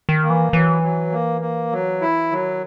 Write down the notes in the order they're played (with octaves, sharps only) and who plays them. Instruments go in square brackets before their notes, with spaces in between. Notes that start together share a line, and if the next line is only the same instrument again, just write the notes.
[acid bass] D#3
[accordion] A#3
[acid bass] E3
[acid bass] E3 [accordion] F#3
[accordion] F#3
A#3
A#3
F#3
E4
[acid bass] D#3 [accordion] F#3